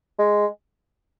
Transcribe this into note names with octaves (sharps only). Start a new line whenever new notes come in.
G#3